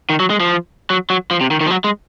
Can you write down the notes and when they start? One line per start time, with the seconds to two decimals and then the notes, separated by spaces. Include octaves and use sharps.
0.10 D#3
0.20 F#3
0.30 G#3
0.40 F3
0.90 F#3
1.10 F#3
1.31 F3
1.41 C3
1.51 D#3
1.61 D#3
1.67 F3
1.70 F#3
1.84 G#3